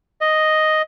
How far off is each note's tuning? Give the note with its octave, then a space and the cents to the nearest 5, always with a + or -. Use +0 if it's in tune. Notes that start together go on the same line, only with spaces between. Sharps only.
D#5 +0